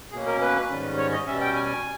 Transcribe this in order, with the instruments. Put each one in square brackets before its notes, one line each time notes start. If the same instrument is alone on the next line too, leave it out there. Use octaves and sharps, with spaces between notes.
[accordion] B2 A#3 C#4 G#4
A#4
B4
G#2 D#3 G3 C#4
C#5
D#5
B2 G3 C#4 E5
G5
G#5